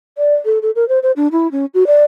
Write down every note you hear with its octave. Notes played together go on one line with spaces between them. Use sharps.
D5
A4
A4
A#4
C5
C5
D4
E4
C#4
F#4
D5